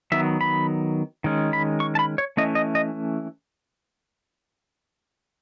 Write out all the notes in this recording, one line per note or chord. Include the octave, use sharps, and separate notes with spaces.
D#3 F#3 B3 E5
B5
D#3 G#3 C#4
B5
C#6
A5
B5
C#5
E3 A3 C#4 D#5
D#5
D#5